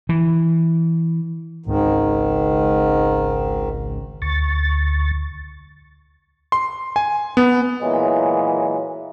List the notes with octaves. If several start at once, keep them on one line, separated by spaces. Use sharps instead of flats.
E3
G#1 C#2 G#2 D#3
D2 C#6 A6
C6
G#5
B3
A#2 E3 F#3 G#3